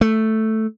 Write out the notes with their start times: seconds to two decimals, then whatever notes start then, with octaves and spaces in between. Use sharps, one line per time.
0.01 A3